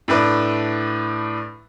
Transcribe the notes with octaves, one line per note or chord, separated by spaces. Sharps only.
A2 A3 D4 B4